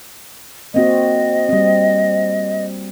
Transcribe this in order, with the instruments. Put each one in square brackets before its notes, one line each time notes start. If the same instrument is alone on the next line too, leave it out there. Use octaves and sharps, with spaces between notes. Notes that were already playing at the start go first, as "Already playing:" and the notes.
[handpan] A#3 C4 F#4 [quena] D#5
[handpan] G3 C4